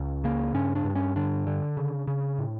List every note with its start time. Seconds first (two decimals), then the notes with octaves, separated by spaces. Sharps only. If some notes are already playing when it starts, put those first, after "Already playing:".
Already playing: C#2
0.24 C#3 A#3
0.54 G2 C#4
0.75 D4
0.85 G2
0.95 C#4
1.16 D3 D4
1.47 D3
1.77 C#3
2.07 C#3
2.38 A2